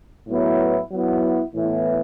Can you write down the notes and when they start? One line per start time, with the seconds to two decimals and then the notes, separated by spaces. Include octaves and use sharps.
0.28 A2 F#3 B3 E4
0.92 F#3 B3 E4
1.55 A2 E3 B3 E4